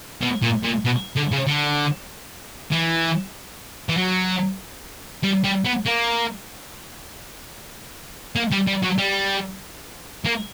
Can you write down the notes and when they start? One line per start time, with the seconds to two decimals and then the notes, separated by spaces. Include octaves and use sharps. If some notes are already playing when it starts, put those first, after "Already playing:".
0.22 B2
0.42 A#2
0.63 A#2
0.85 B2
1.16 D3
1.31 C#3
1.47 D3
2.72 E3
3.89 E3
3.97 F#3
5.23 G3
5.44 G3
5.65 B3
5.86 A#3
8.36 A#3
8.52 G3
8.67 G3
8.83 F#3
8.99 G3
10.25 A#3